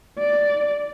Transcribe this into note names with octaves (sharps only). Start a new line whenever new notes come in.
D5